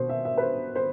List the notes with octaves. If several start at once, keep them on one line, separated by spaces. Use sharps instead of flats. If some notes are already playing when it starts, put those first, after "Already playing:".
Already playing: B2 C5
E5
E5
B4
C5
C5